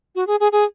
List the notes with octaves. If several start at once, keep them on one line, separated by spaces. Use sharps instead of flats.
F#4
G#4
G#4
G#4